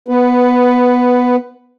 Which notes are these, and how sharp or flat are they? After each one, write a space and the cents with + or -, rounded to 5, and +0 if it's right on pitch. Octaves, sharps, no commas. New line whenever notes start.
B3 -5 B4 +10